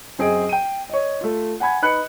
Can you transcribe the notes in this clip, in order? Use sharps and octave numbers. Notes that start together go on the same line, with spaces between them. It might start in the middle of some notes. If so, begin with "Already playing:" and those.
F#2 C4 G#4 D#5 D7
G5 D#7
C#5 D#5
A3 F4
F#5 G#5 B5 G#6
D#4 B4 B5 F#6 C#7